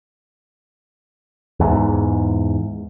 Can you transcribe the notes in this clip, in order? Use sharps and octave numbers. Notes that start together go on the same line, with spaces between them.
E2 G#2